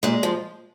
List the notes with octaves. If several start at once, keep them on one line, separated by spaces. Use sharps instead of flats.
A#2 G#3
F3